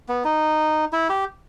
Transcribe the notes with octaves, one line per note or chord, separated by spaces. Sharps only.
B3
D#4
E4
G4